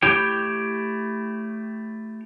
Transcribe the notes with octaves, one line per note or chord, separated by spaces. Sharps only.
A3 E4 G4 C#5 G5